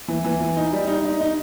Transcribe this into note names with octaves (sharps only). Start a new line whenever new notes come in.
E3
E3
E3
D#4
G3
D#4
D#4
D#4